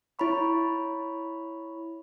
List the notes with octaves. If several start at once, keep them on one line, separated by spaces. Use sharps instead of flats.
E4 C#5 B5 C#6